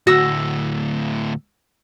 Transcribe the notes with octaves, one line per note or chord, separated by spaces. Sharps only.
D2 A2 F#4 E6 A#6